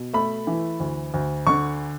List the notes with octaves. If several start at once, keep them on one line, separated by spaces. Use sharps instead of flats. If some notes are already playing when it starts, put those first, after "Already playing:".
Already playing: B2
A3 B5
E3
D2
D2
D3 C#6